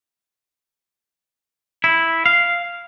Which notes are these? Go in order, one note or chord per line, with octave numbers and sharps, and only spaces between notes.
E4
F5